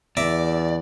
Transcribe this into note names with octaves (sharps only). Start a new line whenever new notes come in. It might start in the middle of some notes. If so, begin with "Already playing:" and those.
E2 D5 E5 A#5 D6